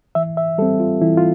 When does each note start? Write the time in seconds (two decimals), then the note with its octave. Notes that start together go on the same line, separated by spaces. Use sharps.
0.15 E3 E5
0.37 E5
0.58 G3 A4
0.62 C4
0.80 F4
1.02 E3 E4
1.17 F4